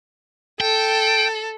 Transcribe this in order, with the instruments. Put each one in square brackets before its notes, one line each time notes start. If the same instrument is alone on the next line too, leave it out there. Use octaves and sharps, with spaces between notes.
[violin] A4 [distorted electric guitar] G5